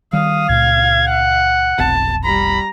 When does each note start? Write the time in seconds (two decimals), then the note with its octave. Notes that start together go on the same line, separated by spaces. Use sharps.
0.13 D#3 G3 F5 D#6
0.49 C#2 A#2 G#6
1.08 F#5
1.79 F1 B1 C4 A5
2.25 G3 A#5 B5